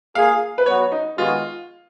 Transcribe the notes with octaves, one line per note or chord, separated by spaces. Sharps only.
A#3 F4 G#4 F5
B4
F#3 B3 F#4 C#5
D#4
D#3 G#3 B3 F4 F#4